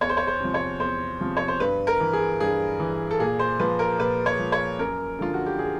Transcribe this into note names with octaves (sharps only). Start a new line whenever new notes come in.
E2 C#5
C5
C#5
C5
C3 F3
C#5
E2 C5
C3 F3
C#5
C5
G2 B4
A#4
E3
G#4
G2 G#4
E3
A4
A#2 G#4
C5
F3 B4
A#4
A#2 B4
C#5
F3
C#5
F#2 A#4
D3 F3 F4
F#4
G4
G#4